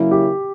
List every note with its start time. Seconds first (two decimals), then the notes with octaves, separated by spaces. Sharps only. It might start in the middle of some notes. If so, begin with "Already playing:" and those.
Already playing: C#3 F#3 A#3 C#4 E4
0.11 G4